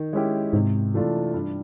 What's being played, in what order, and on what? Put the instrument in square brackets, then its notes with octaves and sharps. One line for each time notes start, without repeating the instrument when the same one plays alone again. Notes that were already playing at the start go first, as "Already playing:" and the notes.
Already playing: [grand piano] D#3
G#3 C#4 E4 G4
[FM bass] G#2 [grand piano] C3
[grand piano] E3 A3 D4 F4
G2